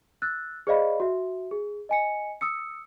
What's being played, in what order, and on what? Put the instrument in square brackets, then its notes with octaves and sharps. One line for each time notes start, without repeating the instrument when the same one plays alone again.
[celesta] E6 F#6 A6
G#4 C5 D5 D#5 F5 B5
F#4 E5
G#4
D#5 G#5 C#7
D#6 E6 C#7